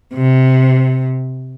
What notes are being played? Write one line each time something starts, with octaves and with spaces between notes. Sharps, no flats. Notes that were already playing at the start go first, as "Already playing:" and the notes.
C3